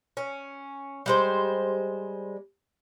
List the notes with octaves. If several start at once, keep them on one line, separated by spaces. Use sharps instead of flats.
C#4
G3 G#3 C5